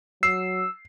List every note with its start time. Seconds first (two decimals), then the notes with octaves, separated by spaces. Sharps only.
0.23 F#3 E6 C7